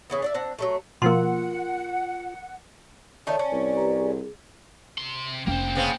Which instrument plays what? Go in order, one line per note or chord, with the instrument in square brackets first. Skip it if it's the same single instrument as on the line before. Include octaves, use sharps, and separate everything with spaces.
[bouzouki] C#3 E3 B3
D4 D5 E5
C4 D4 F#5
F#3 G3 A3
[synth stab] B2 F3 A#3 [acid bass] F4 [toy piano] A#4 C6 [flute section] F#5
[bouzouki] D#3 A3 D#4 [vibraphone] C#5 [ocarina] D5
[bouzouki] C#4
[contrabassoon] C2
[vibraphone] G4 B4 A#5
G#4
[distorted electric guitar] C3 C6
[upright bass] F1 C#4 [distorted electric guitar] A#3 C5 [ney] G5
[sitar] C#3 B3 C4